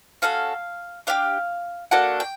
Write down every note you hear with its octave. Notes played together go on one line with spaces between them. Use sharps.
C#4 F#4 A4 F5
D4 G4 F5
A#3 D4 F#4 A4 F#5
G5